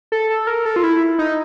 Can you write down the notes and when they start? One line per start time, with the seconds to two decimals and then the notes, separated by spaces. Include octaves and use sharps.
0.12 A4
0.30 A4
0.47 A#4
0.66 A4
0.76 F4
0.83 E4
1.19 D#4